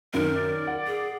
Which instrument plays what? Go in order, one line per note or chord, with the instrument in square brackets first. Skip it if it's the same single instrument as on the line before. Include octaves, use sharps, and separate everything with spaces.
[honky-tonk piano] F#2 D#3 [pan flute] A#4
[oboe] D5
[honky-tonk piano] F#5
[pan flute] G#4